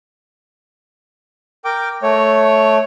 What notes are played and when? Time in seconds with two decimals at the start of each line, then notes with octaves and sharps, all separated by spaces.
1.65 A#4 G5 D6
2.03 A3 C#5